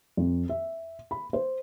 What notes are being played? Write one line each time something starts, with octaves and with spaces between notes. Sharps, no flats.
F2
E5
B5
C5